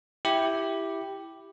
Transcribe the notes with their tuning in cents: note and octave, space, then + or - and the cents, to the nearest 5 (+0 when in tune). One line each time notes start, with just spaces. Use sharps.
E4 +0 G4 +0